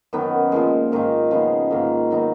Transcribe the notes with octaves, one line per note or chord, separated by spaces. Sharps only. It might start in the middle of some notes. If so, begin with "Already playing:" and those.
F#2 D#3 F#3 B3
A#2 F3 G#3
G#2 D#3 A#3 D#4
C#3 F3 B3 D#4
G#2 D#3 A#3 F4
D#3 F#3 B3 D#4